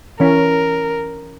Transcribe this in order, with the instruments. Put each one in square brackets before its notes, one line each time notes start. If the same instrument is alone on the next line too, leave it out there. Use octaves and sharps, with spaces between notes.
[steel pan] E3 C#4 [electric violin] A#4